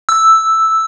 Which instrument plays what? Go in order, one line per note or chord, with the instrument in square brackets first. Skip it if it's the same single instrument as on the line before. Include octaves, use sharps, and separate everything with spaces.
[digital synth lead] E6